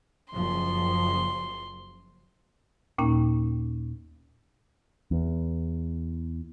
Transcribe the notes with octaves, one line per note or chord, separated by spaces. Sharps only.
F#1 F#2 F3 C6
D#2 A#2 A#3 C#4 D#4
E2